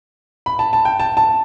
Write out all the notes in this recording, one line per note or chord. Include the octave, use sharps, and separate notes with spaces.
B5
A5
A5
G5
A5
A5